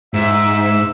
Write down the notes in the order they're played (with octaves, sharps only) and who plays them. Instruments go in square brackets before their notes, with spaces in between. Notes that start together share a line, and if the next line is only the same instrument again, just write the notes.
[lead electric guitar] G#2 [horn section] E5